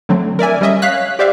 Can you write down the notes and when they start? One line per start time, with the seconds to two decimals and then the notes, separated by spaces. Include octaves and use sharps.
0.09 D3 F#3 A3 C4
0.39 A#4 D5 E5 G#5
0.61 G3 C#4 D#5 E5
0.82 C#5 F5 F#6 B6
1.19 G4 C5 D5 E5 F5